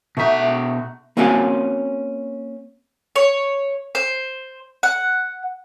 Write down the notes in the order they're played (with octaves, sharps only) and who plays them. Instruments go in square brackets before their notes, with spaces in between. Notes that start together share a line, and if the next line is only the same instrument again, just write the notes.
[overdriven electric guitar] B2 E5 [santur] A3 D#4 F#4
[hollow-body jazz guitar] A#3 C4 C#4 F#4 F5 G#5
[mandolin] C#5
C5
F#5